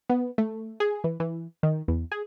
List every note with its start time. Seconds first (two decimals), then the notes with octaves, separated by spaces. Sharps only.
0.10 B3
0.38 A3
0.80 G#4
1.04 E3
1.20 E3
1.63 D#3
1.88 E2
2.12 G#4